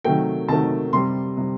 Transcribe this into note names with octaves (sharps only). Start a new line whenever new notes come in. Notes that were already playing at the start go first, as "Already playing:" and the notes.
C3 D#3 F#3 A3 G5
C3 D#3 F#3 A3 A5
C3 G3 C6
C3 G3